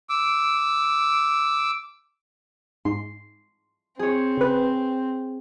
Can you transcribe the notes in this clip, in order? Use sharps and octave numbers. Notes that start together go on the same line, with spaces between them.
D6 E6
G#2 C6
C4 G#4 C#5
C#3 B4